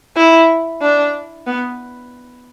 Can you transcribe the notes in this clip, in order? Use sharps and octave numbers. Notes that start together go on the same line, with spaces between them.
E4
D4
B3